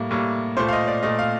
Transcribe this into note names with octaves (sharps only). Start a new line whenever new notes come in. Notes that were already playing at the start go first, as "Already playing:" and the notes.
Already playing: A2 G3 A#3
A2 G3 A#3
A#2 A3 C5
F5
D#5
D5
A#2 A3 D#5
F5